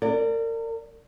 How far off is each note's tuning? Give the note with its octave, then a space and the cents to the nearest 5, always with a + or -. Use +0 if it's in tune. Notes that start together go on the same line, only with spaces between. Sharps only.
A#4 -35 D5 +0